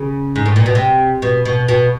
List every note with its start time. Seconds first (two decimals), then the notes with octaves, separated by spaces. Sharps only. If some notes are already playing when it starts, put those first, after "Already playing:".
Already playing: C#3
0.36 G#2
0.46 A2
0.56 A#2
0.66 B2
0.75 C3
1.22 B2
1.46 B2
1.68 B2